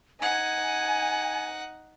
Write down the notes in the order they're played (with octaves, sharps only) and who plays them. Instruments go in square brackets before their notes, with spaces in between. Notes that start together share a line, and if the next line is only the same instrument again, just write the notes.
[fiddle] D#4 F#5 [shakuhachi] G#5